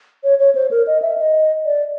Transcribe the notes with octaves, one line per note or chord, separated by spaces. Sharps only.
C#5
C#5
C5
A#4
D#5
E5
D#5
D5